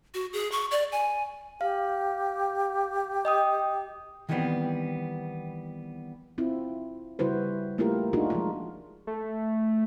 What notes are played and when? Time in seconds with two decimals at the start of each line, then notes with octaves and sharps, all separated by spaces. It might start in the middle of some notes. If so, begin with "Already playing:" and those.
0.14 F#4
0.33 G#4
0.52 C#6
0.71 D5
0.92 G#5
1.61 G4 F5
3.25 D#5 G5 D#6
4.29 D#3 E3 G3 A3 B3 C4
6.38 C4 E4 F4
7.19 C#3 G3 E4 F#4 B4 C5
7.78 A3 A#3 E4 F4 G4 A#4
8.13 D4 D#4 F4 F#4 G#4 A#4
8.30 F3 G#3 F4
9.07 A3